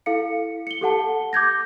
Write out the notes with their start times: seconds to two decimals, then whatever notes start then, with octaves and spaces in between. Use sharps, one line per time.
0.06 E4 A4 F5 C#7
0.67 C#7 G7
0.81 G4 A4 F#5 A5
1.33 D6 G6 G#6 A#6